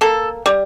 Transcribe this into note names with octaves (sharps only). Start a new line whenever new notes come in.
A#3 A4
G3